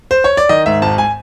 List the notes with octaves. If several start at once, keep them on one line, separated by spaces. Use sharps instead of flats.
C5
C#5
D5
D#3 D#5
G#2 E5
G#1 A5
G#5